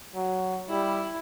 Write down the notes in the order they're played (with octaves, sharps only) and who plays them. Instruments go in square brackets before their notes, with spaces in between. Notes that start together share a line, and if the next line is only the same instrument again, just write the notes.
[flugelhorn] F#3
[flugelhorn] G3 [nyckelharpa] E4